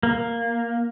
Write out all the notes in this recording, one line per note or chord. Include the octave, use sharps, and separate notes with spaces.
A#3